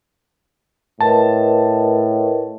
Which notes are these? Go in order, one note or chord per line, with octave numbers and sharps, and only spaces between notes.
A2 A#4 B4 D#5 A5